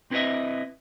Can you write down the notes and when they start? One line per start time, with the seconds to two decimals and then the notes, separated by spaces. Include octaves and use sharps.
0.11 C4 E4 B4 C5 D#5 E5